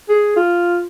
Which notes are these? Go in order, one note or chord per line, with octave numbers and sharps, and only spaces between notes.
G#4
F4